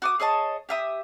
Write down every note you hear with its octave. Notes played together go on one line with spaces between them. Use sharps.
F#4 D6 D#6
G#4 C#5 D#5 A5
G4 E5 D#6